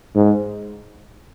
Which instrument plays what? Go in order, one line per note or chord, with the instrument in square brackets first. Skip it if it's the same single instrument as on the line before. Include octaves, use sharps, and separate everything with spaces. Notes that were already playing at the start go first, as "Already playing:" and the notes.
[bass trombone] G#2